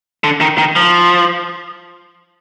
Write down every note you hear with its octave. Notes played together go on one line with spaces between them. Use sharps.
D3
D#3
D#3
F3